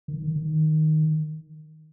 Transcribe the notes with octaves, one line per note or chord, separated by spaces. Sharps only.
D#3
D#3
D#3